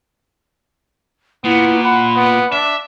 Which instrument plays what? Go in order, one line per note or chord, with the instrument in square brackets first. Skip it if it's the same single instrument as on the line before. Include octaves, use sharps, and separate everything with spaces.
[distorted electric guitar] A#2 [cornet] B3 [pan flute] E4
[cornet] F#5 [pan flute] B5
[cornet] B3
[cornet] D4 [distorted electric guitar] E5